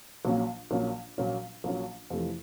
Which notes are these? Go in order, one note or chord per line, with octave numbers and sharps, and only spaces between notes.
A#1 A#2 F#3 A#3 C#4
A#1 A#2 F#3 A#3 C#4
A#1 A#2 F#3 A#3 C#4
A#1 A#2 F#3 A#3 C#4
F2 C3 E3 A3